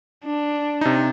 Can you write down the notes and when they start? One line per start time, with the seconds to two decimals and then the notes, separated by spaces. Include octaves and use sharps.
0.25 D4
0.81 C3 D#4